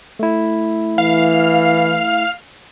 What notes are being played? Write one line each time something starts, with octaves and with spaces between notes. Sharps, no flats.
A3 E4
E3 F5